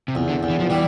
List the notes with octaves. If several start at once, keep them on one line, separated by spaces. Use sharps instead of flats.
C3
E2
D3
E2
E3
F3
E3 G3